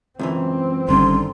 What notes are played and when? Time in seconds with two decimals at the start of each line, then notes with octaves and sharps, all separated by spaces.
0.19 C#2 F#2 E3 C4
0.89 G1 D3 D#3 G3 C#4 C6